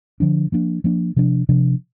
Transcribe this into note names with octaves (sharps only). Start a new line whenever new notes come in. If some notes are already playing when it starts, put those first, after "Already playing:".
D3 F3 D4
F3 A#3 D4
F3 A#3 D4
C3 F3 D4
C3 F3 D4